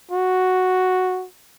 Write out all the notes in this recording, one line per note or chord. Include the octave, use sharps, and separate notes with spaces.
F#4